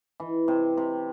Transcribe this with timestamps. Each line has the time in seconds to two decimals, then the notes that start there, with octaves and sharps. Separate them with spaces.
0.20 E3
0.48 C3
0.78 C3